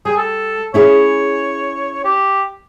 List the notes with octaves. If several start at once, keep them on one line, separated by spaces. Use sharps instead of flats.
G3 G#4
A4
C#4 E4 G#4 C#5
G4